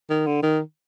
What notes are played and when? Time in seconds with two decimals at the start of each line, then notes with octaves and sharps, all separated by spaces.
0.10 D#3
0.26 D3
0.43 D#3